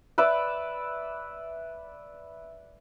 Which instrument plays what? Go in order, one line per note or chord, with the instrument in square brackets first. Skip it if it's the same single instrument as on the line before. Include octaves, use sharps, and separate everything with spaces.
[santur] B4 D5 E5